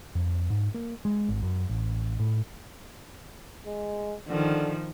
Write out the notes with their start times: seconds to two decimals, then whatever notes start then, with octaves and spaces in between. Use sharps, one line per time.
0.15 F2
0.50 G#2
0.74 A#3
1.05 G#3
1.29 G#1
1.43 F#2
1.70 A1
2.20 A2
3.66 G#3
4.29 D3 D#3 F3